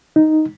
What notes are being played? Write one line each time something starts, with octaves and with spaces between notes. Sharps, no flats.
D#4